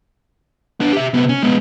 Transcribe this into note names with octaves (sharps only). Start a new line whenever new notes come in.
B3 D4
G4 E5
C3 B3
C#4
G#3 B3